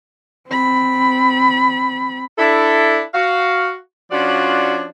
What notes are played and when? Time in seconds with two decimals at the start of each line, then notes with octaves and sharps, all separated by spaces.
0.48 C4 B5
2.38 D4 E4 A4
3.14 F#4 F5
4.11 F3 C#4 D4 F4 F#4 D5